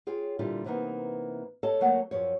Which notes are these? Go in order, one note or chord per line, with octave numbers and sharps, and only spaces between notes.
F4 G#4 C#5 G5
A#2 D3 G3 E4 F4
C3 E3 A#3 B3 D#4
A4 C#5 D#5 A5
D2 F#3 A3 A#3 C#5 F#5
F#2 F3 C#5